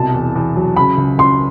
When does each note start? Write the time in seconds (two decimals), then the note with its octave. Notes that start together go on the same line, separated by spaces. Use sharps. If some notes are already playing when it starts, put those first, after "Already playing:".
Already playing: C2 B2 A5
0.14 E2
0.35 E2
0.56 F#3
0.76 C#3 B5
0.98 C#2
1.18 C#2 C6